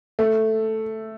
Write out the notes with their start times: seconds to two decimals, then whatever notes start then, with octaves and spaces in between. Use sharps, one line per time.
0.19 A3